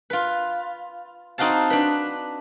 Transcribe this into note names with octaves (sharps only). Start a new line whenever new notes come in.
F4 B4
C4 D#4 F#4 F5 A5
D4 B4